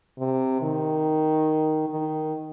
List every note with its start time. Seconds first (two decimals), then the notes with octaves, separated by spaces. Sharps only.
0.19 C3
0.62 D#3
1.89 D#3